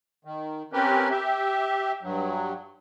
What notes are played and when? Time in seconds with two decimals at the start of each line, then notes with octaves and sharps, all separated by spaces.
0.25 D#3
0.73 C4 C#4 G4 A#4 B4
1.10 G4 E5
2.03 G2 F#3